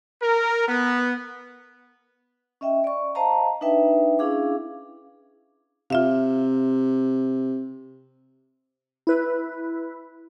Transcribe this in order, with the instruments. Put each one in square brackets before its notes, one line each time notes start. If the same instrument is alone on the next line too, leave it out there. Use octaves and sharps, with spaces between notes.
[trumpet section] A#4
B3
[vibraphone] C#4 D#5 E5 G5
D5 C#6
C5 D#5 F5 A5 A#5
D4 D#4 B4 E5 G5
C#4 D4 E4 G#4 F5 D6
[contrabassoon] C3 [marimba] F4 E5 F5
[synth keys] E4 B4